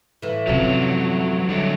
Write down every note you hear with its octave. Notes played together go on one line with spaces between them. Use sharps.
A2 E3
F#2 C3 F3 F#3
D3 F#3 G3 A3